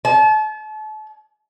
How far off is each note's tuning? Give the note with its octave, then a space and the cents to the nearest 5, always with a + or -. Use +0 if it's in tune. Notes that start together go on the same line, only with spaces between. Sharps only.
A5 -35